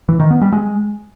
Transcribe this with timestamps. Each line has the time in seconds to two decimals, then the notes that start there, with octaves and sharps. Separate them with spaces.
0.09 E3
0.20 D#3
0.31 B3
0.42 G3
0.52 G#3